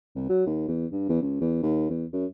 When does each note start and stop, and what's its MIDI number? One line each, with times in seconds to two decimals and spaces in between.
0.15 0.27 36
0.29 0.45 54
0.46 0.63 39
0.68 0.86 40
0.92 1.06 43
1.09 1.21 40
1.21 1.40 37
1.41 1.61 40
1.62 1.89 39
1.90 2.05 40
2.13 2.25 42